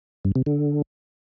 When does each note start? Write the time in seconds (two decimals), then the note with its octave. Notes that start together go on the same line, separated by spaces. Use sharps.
0.25 G2
0.36 C3
0.46 D3